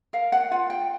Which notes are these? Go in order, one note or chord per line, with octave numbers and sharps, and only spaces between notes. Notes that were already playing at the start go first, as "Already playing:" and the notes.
A#4 F5
F#5
F4 F#5
G5